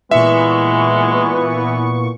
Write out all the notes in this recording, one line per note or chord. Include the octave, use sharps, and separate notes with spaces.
A#2 E3 G#3 B3 E5 C#6